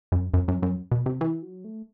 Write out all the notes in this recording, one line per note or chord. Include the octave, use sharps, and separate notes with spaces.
F#2
F#2
F#2
F#2
B2
C3
E3
F#3
A3